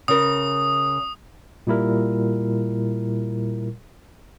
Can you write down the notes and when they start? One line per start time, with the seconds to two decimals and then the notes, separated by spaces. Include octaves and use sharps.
0.08 C#3 A#4 D#6
1.67 A#2 G3 E4 A#4